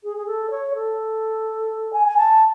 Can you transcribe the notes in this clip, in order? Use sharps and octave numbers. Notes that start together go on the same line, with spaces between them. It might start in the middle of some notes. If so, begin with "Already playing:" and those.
G#4
G#4
A4
C#5
A4
G#5
G#5
A5